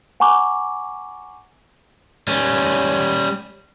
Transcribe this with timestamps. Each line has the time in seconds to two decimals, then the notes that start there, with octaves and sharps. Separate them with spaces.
0.20 F#5 G#5 A#5 C#6 D6
2.28 G3 C#4